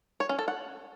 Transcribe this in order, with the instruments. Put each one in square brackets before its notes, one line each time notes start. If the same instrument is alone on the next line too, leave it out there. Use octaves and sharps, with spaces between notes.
[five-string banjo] C#5
C#4
A4
F#5